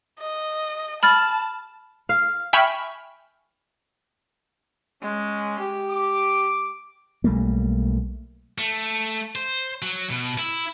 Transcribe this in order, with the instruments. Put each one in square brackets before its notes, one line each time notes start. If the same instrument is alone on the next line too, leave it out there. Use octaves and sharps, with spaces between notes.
[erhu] D#5
[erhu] A5 [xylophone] B5 F6 A6
[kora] F5
[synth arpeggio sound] E5 G5 G#5 B5 C#6 F6
[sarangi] G#3 [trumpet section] C#4
[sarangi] G4
[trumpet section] D6
[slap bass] B1 G3 A3 A#3
[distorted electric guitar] A3
C5
F#3
B2
E4